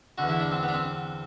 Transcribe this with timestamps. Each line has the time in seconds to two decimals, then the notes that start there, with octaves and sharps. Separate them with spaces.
0.18 E2 D3 F#4
0.29 E4
0.40 D4
0.52 C4
0.63 B3
0.68 D4
0.74 C4